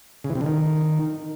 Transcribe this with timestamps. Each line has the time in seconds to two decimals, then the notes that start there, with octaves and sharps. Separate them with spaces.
0.24 C#3
0.30 E3
0.35 C3
0.41 D3
0.46 D#3